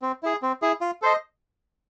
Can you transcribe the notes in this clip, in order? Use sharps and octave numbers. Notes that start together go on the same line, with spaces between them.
C4
E4 G#4
C4
E4 G#4
F4
A4 C5 D#5